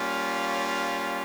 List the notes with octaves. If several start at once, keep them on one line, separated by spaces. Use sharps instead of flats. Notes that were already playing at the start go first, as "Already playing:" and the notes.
Already playing: G3 A#3 C#4 F4
C#5